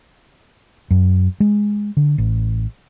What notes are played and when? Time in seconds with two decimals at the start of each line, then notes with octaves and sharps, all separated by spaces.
0.91 F#2
1.40 G#3
1.97 D3
2.18 A1